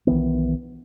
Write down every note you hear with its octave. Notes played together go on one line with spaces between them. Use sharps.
B1 D#3 E3 B3